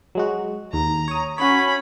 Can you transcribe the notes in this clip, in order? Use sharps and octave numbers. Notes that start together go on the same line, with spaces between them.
F#3 G#3 F#4
D#2 A#5
C#5 D#6
C#4 F#4 C#5 B5